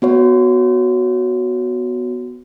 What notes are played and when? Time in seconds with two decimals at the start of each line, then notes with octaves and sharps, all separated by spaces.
0.02 B3 F#4 C#5